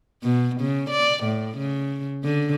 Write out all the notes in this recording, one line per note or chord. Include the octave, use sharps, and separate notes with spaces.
B2
C#3
D5
A2
C#3
D3